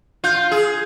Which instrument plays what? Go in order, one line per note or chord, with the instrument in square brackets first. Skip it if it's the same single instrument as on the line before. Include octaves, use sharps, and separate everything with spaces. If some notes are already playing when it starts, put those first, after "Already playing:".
[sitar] F4 [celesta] G6
[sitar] G#4